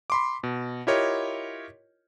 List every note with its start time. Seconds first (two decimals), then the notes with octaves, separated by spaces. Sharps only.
0.10 B5 C6 D6
0.43 B2
0.87 E4 F4 G4 A#4 C#5 D#5